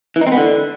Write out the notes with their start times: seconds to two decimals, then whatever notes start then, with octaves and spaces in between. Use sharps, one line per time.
0.16 E3
0.21 D#4
0.27 C4
0.32 B3
0.37 D3